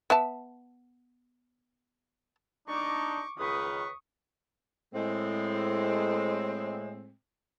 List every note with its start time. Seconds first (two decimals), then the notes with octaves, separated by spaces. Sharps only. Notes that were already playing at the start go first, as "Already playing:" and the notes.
0.10 B3 E5 A5
2.68 D4 D#4 C#6 D6
3.38 C#2 D#3 B4 C#6 D#6
4.94 A2 G#3 C4